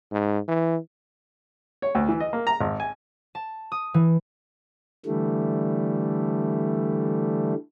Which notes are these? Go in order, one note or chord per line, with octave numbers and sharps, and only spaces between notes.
G#2
E3
C#5
D2
E3
D#5
A#3
A#5
G#1
G#5
A5
D#6
E3
D3 E3 G3 A3